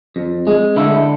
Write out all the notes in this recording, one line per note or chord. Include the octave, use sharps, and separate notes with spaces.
F2
G#3
D3 E4